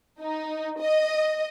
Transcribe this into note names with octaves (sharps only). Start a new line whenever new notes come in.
D#4
D#5